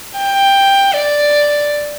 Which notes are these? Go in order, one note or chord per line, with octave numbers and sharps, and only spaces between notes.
G5
D5